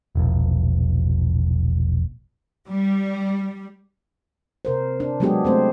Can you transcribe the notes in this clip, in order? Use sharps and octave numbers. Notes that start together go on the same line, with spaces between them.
E1 A#1
G3
C3 A#4 C5
D4
F#3 G#3 B3 D4 G4 G#4
A3 C4 C5